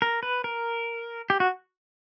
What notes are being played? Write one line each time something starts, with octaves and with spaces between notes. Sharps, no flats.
A#4
B4
A#4
G4
F#4